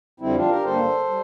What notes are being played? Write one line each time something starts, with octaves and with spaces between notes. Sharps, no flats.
F2 D3 G3 C4 E4
D4 F4
G4 A#4
G2 D3 G3 A#3 A4 C5
G3